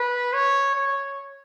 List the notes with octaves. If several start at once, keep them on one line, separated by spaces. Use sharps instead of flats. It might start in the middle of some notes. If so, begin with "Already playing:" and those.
Already playing: B4
C#5
C#5